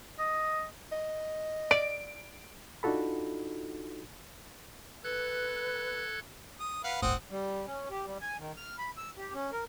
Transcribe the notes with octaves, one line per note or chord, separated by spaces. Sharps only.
D#5
D#5
D5 D7
D4 D#4 F4 F#4 A4 B5
A4 B4 F#6 G#6
D#6
B4 F5 F#5
D1 G1 A2 C4 F#5 D#6
G3
C#4
G4
G3
G#5
D#3
F6
B5
E6
G4
C#4
A#4